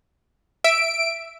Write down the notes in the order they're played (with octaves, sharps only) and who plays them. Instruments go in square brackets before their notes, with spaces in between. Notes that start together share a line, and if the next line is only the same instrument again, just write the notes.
[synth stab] E5 [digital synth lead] D7